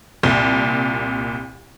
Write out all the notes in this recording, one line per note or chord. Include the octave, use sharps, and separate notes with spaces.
C2 A#2